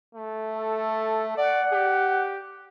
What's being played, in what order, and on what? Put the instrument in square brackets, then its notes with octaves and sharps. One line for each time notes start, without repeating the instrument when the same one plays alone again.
[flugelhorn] A3
[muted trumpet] A4
[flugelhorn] D5 [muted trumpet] F#5
[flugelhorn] G4